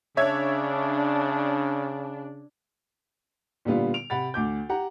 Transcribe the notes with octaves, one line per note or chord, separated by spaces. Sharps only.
C#3 D4 C#5 E5 G#6
A#2 D3 G3 B3 F4
D7 F7
C3 F#5 B5 A6
D2 D6 G6
G4 F#5 A#5